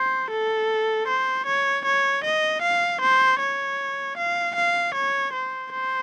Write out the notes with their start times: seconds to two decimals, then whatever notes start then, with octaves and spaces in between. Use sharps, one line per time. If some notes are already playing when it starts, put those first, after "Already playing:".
Already playing: C5
0.30 A4
1.08 C5
1.46 C#5
1.85 C#5
2.24 D#5
2.62 F5
3.01 C5
3.40 C#5
4.17 F5
4.56 F5
4.95 C#5
5.33 C5
5.72 C5